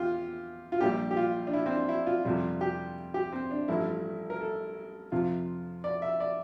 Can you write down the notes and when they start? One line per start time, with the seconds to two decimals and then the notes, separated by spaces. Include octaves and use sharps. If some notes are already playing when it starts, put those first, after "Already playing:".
Already playing: E2 F4 G4
0.72 F4
0.81 A#1 A#2 G3 G4
1.11 G4
1.17 F4
1.47 D4
1.53 E4
1.66 C4
1.71 D4
1.89 E4
2.06 F4
2.25 F2 C3 G3 F4
2.61 G4
3.14 G4
3.32 C4
3.51 D4
3.68 A1 G2 F3 A3 E4
4.30 A#4
4.41 A4
5.12 F2 C3 F3 F4
5.84 D5
6.02 E5
6.20 D5